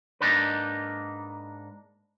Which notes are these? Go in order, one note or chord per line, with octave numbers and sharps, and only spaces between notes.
G#2 C3 A#3 D4 D#4 B4